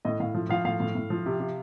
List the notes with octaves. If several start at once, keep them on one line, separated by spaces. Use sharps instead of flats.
A2 D#5
A2 F5
F3
F3 F5
A2 F5
A2
A2
F3
C3
C3